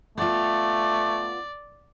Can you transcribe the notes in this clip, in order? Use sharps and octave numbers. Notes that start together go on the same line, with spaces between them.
A3 B3 F4 D5